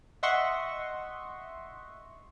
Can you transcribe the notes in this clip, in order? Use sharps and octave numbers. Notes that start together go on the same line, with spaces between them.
D#5 E5 F#5 C6 C#6